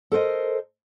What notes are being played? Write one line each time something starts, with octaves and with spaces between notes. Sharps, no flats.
A4 A#4 C5 D#5